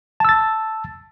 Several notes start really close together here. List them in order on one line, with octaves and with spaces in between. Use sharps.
A5 E6 A6